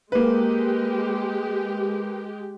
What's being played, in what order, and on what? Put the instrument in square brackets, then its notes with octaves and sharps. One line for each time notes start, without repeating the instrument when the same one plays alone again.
[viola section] G#3 G4 [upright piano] A#3 B4